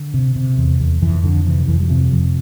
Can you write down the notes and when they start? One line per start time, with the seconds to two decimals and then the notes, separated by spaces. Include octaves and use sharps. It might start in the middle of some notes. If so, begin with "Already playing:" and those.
Already playing: D3
0.14 C3
0.36 C3
0.58 E2
0.80 E2
1.02 F2 E3
1.23 F2 D3
1.46 C3 E3
1.68 F2 E3
1.80 G3
1.90 C3 F3
2.13 F2